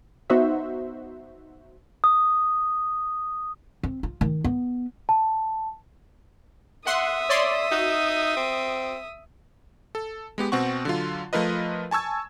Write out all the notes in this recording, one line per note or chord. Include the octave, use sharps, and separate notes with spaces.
B3 D#4 F#4 C5 E5
D#6
C4
F4
D#3
B3
A5
E5 F#5 C6 D#6
C#5 D5 C6
D#4 F#4
C4
A4
G#3 B3 G4
B2 C4 F#5 C#6
D3 F#3 F4
F3 A3 F4 A#4 B4 D#5
G#5 A5 C#6 E6 G#6